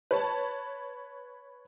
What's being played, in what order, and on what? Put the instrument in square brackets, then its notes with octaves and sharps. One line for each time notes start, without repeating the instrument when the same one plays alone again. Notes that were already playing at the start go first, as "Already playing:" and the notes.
[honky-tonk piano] B4 C#5 A5